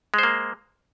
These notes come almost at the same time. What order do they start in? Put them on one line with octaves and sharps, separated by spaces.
G#3 C5 A#3